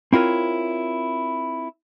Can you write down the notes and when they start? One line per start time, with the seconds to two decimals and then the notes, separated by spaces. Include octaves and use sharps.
0.13 C4 E4 F4 A#4 C#5